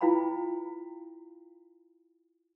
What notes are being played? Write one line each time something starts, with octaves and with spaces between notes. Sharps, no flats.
E4 F4 B4 F5 G5 B5